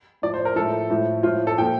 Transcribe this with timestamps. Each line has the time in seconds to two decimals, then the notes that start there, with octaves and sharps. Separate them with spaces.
0.22 A2 F3 D5
0.34 C5
0.45 A#4
0.56 A2 F3 A4
0.90 A2 F3
1.23 A2 F3 F4
1.47 A4
1.58 A#2 F3 G5